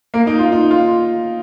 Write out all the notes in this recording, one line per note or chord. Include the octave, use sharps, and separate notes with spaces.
A#3
D#4
F4
D#4
F4